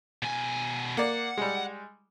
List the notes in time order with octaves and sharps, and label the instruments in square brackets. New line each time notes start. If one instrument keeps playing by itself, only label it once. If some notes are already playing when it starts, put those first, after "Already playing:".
[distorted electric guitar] B2 G#5
[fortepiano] A#3 D5 [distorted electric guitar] F#5
[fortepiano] G3 G#3